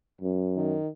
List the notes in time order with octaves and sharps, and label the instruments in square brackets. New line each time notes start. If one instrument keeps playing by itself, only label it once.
[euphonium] F#2
[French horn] D#3